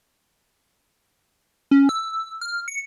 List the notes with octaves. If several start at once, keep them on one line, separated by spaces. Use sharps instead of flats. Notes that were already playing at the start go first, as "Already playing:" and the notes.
C#4
E6
F6
C#7